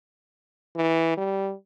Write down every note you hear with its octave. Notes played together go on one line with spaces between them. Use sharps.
E3
G3